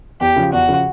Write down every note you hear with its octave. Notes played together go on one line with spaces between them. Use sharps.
E2 G4
C#3 F3
E2 F#4
C#3 F3